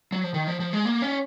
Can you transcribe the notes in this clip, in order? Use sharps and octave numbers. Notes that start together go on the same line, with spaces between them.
F#3
F3
D#3
F3
F3
G#3
A#3
C#4